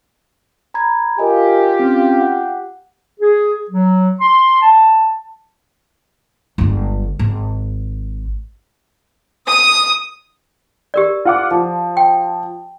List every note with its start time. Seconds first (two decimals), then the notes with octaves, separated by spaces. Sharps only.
0.74 A#5 B5 G#6
1.18 F4 G4 A#4 D#5 G#5
1.79 C4 C#4
2.21 F#5
3.20 G#4
3.70 F#3
4.21 C6
4.62 A5
6.58 G1 G#3
7.19 G#1
9.46 D#6
10.94 G4 A#4 D5
11.25 F4 F#5 D6
11.51 F3
11.97 G5